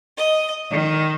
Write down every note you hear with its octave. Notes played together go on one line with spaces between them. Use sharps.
D#5
D#3